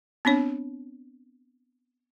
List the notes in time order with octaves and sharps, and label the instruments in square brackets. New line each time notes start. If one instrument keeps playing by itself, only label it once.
[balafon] B3 C4 D4 C#5